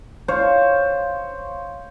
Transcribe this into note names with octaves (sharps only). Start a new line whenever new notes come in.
C5 C#5 F5